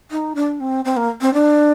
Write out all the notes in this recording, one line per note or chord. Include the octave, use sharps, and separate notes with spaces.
D#4
D4
C4
C4
A#3
C4
D4